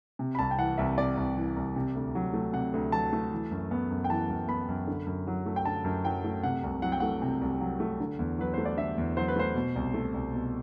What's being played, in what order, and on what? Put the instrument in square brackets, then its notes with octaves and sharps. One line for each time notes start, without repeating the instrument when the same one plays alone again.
[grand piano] C3
B5
C2 A5
G5
E3 F#5
C2 E5
C3 D5
C2
E3
C2
C3
D2
F#3
A3
C3 F#5
D2
F#3 A5
A3
E3
F#2
B3
F#2
G5
E3 A5
F#2
B3 B5
F#2
D3
F#2
F#3
A3
G5
D3 A5
F#2
F#3 G5
A3
C3 F#5
C2
F#3 F#5
G5
A3 F#5
C3
C2
F#3
A3
D3
E2
F#3 B4
A3 C5
D5
D3 E5
E2
F#3 C5
B4
A3 C5
B2
C2
A3
C2
B2